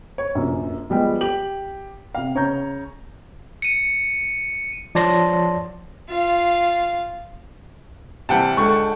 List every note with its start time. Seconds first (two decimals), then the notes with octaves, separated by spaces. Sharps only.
0.18 C#5
0.35 F1 A#1 F#2
0.90 F3 G3 G#3 B3
1.21 G4 F#7
2.15 C3 F5
2.35 C#3 C#5 A#5 G6
3.62 C#7 D#7
4.95 F3 C#5 D5 A5 C6 A#6
6.09 F4 F5
8.29 C3 E3 G3 F#5 G5 A5
8.57 C#2 D3 C#6